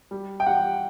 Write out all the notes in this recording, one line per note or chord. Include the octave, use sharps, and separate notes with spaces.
G3
G5
G3 F#5